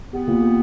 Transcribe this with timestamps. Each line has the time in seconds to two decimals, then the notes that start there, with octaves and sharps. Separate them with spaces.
0.13 B3 G4
0.28 A#2
0.42 G4